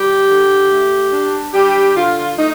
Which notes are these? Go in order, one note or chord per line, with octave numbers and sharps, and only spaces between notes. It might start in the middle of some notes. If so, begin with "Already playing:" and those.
Already playing: G3 G4
D3
A3
D4
G3 D4 G4
D3 F4
A3 D#4